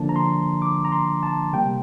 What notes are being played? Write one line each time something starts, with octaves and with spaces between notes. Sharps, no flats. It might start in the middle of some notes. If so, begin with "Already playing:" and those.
Already playing: D3 F3 A#3 D4 A5
A#5
C6
D6
A#5
C6
A5
C3 G3 A#3 G5